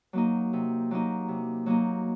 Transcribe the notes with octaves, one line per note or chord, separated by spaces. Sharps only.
F#3 A#3 D#4
C3
F#3 A#3 D#4
C3
F#3 A#3 D#4